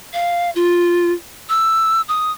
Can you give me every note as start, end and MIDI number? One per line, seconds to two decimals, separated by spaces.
0.13 0.50 77
0.56 1.12 65
1.49 2.01 88
2.09 2.32 87